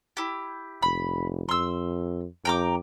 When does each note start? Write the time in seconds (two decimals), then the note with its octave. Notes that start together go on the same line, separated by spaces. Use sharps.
0.17 E4 G4
0.82 F1 B5
1.49 F2 C6 E6
2.45 F2 G5 A#5 D6